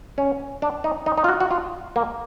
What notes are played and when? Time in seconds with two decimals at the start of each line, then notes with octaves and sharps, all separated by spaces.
0.18 C#4
0.62 D4
0.84 D#4
1.06 D#4
1.18 D#4
1.24 F4
1.29 F#4
1.40 F#4
1.51 F4
1.96 A#3